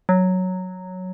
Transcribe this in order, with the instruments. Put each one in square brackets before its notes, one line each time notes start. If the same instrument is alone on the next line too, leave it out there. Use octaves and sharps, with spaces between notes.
[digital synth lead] F#3